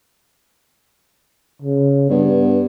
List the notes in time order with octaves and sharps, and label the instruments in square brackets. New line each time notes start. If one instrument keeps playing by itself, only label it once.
[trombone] C#3
[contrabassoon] G2 [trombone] B3